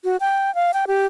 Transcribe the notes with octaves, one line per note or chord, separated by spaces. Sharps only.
F#4
G5
F5
G5
G4